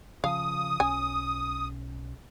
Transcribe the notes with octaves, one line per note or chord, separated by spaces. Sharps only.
C#3 F3 F5 D#6
B1 C#4 G#5